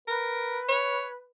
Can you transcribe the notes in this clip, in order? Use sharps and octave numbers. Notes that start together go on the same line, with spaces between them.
A#4 B4
C#5